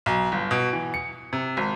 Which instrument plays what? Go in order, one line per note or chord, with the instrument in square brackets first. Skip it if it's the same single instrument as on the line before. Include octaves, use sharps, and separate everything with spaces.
[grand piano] B1
G1
B2
E3
C#7
C3
G#1